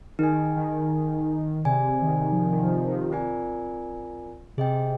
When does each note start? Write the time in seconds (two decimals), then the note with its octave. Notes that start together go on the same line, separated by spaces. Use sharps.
0.19 D#3 D#4 G#4 D#5 G#5
0.56 D#3
1.65 C3 G#4 D5 G#5
2.02 D#3
2.32 F3
2.38 D#3
2.52 D#3
2.63 F3
2.88 D#3
3.11 C4 F4 A#4 D5 G#5
4.57 C3 G#4 D#5 G5